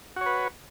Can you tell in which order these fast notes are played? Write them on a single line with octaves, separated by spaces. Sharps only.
F#4 C#5 B4